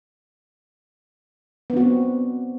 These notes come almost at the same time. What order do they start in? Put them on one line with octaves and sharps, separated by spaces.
B3 D4 F#4 C4